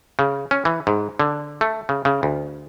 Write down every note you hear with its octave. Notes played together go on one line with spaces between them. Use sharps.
C#3
C#4
E3
G#2
D3
A3
C#3
C#3
D2